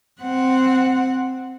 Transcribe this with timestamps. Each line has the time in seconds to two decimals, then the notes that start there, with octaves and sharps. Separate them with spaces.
0.22 C4 F#5